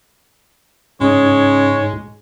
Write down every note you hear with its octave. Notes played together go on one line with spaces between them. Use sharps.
G#2 C#3 G#3 G#4 C#5